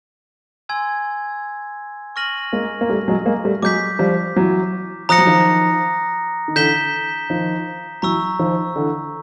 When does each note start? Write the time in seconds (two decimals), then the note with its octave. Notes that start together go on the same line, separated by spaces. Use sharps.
0.69 G#5 C6 E6 G#6
2.16 C#6 F6 A#6 D#7 F#7
2.53 G#3 A#3
2.81 A#3
2.90 G3 A3
3.08 F#3 G#3
3.26 G#3 A#3
3.44 G3 A3
3.62 F#3 G#3 D6 G6 B6
3.99 F3 G3
4.36 E3 F#3
5.09 F3 A#5 D#6 F#6 A#6 C#7
5.18 F#3
5.27 D#3 F3
6.48 D#3
6.56 D3 E3 G6 B6 E7 G7
7.30 D#3 F3
8.02 E3 F#3 A#5 C#6 E6
8.39 D#3 F3
8.76 D3 E3